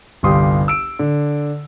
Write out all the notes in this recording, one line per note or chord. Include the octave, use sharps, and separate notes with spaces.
G1 C2 G4 F5 C6 D#6
E6 D7
D3